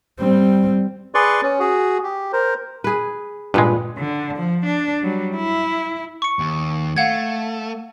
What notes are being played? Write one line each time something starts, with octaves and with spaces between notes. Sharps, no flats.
G3 C4
G#4 B4 D5 C6 C#6
C#4
F#4 G#4
G4
A#4 C5
G#4 B4
G2 A#2 G#3 B4
D3
F3
D4
F#3 G3
E4
C#6 C#7
D#2
A3 F5 F#5 G#6